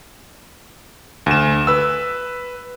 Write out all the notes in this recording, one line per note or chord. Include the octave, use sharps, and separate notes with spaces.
D2 E7
B4 E6